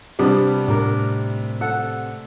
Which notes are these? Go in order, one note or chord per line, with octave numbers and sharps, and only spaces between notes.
C3 G3 B3 D4
A2 D4 A#4
A4 F#5